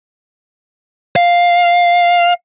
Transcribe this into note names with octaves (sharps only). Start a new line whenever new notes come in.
F5